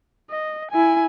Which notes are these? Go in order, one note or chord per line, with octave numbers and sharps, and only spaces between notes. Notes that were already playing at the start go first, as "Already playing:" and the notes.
D#5
E4 G#5